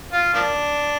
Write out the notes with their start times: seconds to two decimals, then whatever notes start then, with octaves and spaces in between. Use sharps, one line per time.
0.13 F4
0.34 F3 A#3 D4